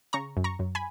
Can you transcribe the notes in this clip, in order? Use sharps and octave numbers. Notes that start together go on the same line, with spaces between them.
C#3 A#5 C#6
F#2
A#5 C#6
F#2
G#5 B5